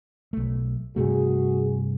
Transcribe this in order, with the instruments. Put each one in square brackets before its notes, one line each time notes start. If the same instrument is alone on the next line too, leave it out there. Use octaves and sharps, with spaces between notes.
[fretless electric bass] B1 A3
[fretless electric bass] G2 C3 A3 [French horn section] F#4 G#4